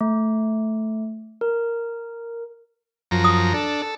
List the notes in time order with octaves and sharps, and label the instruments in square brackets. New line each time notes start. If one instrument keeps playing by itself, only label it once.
[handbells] A3
A#4
[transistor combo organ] F#2 F3 A#5
[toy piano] D#6
[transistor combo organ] D4 A4
A4